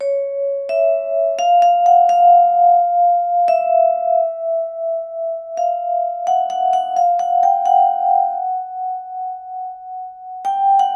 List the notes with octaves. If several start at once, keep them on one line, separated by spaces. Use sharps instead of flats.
C#5
E5
F5
F5
F#5
F5
E5
F5
F#5
F#5
F#5
F5
F#5
G5
F#5
G5
F#5